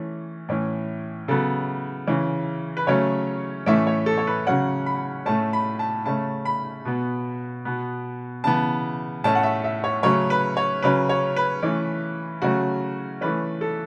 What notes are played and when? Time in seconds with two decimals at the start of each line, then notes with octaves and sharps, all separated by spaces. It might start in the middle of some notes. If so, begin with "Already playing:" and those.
Already playing: E3 A3 C#4
0.49 A2 E3 C#4
1.28 C#3 F#3 B3 A4
2.07 C#3 E3 C#4
2.77 B4
2.87 C#3 F#3 A3 C#4 C#5
3.66 A2 E3 A3 C#4 E5
3.87 C#5
4.06 A4
4.18 C#5
4.27 B4
4.47 C#3 F#3 C#4 F#5
4.86 B5
5.26 A2 A3 C#4 A5
5.53 B5
5.79 A5
6.06 C#3 A3 C#4 A5
6.45 B5
6.85 B2 B3
7.65 B2 B3
8.44 C#3 E3 B3 A5
9.24 A2 A3 C#4 A5
9.35 F#5
9.43 E5
9.64 E5
9.84 C#5
10.03 C#3 F#3 A3 C#4 C#5
10.30 B4
10.57 C#5
10.82 C#3 F#3 C#4 B4
11.09 C#5
11.36 B4
11.63 E3 A3 C#4
12.42 C#3 F#3 A3 C#4 F#4
13.21 E3 A3 C#4 B4
13.61 A4